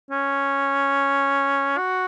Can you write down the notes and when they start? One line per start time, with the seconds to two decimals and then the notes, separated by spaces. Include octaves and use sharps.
0.11 C#4
1.78 F#4